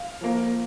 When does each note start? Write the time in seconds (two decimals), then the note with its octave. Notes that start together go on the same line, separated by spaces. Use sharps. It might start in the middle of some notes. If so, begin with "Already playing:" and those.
Already playing: F5
0.21 F3 A#3